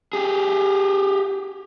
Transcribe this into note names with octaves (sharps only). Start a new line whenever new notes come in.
G4 G#4